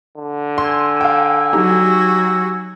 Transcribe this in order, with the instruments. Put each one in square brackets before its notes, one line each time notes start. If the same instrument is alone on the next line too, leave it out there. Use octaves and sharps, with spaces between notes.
[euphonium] D3
[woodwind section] G#5 E6 [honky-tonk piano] C6
[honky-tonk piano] F5 G5
[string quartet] F#3 F#4 [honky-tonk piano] D#4 G4